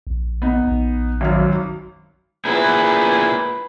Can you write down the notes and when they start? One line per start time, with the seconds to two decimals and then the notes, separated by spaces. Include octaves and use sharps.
0.07 A#1
0.42 B3 D#4
0.67 A#1
1.21 G#1 F#2 F6
2.45 A#2 E4 G#4 B4